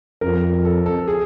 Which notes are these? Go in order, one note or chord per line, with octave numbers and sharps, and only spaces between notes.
F2 A#4
A4
A4
G#4